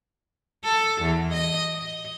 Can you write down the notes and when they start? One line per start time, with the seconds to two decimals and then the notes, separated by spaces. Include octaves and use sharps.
0.64 A4
1.02 E2
1.33 D#5
1.74 D#5